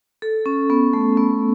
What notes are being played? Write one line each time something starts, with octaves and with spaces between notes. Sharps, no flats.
A4
C#4
B3
A3
B3